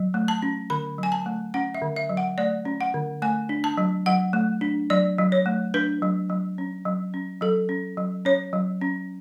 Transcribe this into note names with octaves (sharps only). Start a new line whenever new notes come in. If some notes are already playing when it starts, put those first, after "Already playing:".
Already playing: F#3
A3
A5
C#4
D3 B5
F#3 G#5
A5
A3
C#4 F#5
E5
D3
E5
F#3
F#5
A3 D5
C#4
F#5
D3
A3 G#5
D4
A5
F#3
F#3 F#5
A3
D4
F#3 D5
F#3
C#5
A3
D4 B4
F#3
F#3
C#4
F#3
C#4
F#3 A4
C#4
F#3
C#4 C#5
F#3
C#4